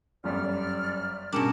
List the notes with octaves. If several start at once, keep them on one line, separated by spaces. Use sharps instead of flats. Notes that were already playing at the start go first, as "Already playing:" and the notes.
G1 F#2 G3 D5 F6
B2 G3 C#4 D4 G#4 A#4